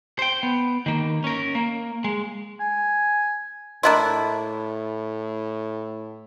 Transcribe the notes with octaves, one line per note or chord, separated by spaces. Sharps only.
C5 G5
B3
D#3 A#3
C#4 A#4
A#3
G#3
G#5
A2 A#3 D4 E4 D#5 C6